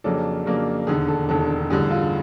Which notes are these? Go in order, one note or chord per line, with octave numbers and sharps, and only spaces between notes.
F2 C#3 F#3 A#3 D4 A4
F2 C#3 F#3 A#3 D4
E1 D#2 D3 G#4
A4
E1 D#2 D3 A4
A1 G2 D3 G#4
F4